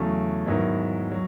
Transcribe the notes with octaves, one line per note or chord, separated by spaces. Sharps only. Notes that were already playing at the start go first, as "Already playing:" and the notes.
Already playing: E2 C#3 F#3 A3
G#2 D#3 F#3 B3 E4
F#3